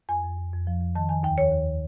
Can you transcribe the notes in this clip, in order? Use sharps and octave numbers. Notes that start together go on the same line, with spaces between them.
F2 G#5
F2
F2
F2
F3
F2
D#3 A5
D#3 G#5
D#2 G5
D#3 C#5
D#2